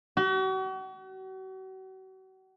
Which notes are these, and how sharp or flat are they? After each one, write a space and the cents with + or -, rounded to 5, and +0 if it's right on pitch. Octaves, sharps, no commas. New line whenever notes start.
F#4 +40